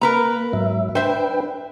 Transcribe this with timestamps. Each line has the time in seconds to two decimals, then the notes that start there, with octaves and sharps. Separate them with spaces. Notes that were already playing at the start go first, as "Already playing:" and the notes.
0.01 A#3 A#4 B4 A#5
0.53 G#2 F#3 E5
0.95 D4 B4 C5 E5 G5